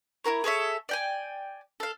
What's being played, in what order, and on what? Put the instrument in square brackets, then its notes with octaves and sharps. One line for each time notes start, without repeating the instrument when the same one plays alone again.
[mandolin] E4 F4 A#4 C#5
G#4 A4 C#5 E5
D5 G5 G#5
A4 F5